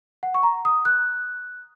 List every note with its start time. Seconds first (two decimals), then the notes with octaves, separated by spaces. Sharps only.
0.23 F#5
0.34 C#6
0.43 A#5
0.65 D#6
0.85 F#6